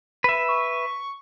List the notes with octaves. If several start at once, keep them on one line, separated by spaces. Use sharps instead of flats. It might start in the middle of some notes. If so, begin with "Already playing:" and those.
B4 E5
C#6